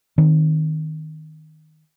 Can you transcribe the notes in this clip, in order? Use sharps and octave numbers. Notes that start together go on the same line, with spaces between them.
D#3 C4